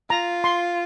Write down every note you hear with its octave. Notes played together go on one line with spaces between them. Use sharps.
F4 A#5
C6